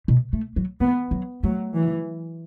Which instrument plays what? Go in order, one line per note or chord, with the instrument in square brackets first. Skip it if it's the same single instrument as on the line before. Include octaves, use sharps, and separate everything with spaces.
[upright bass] B2
A3
F#3
[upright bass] E3 [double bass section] B3
[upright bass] F#3
[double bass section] F#3 [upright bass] A3
[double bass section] E3